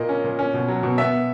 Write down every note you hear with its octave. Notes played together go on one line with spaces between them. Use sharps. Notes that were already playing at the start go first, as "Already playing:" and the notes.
Already playing: A#2 A#3 D#5
C#4
A#2
C#4
B2
F#3
B2
B3 E5
B3